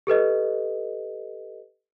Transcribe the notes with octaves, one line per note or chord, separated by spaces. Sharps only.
G4 A4 B4 D#5